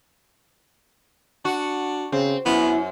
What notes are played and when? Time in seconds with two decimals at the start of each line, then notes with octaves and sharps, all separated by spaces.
1.45 D4 F#4
2.12 C#3 C4
2.46 F#2 B3 E4